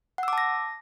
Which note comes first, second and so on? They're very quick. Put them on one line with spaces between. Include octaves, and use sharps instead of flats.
F#5 E6 D6 A5 A#6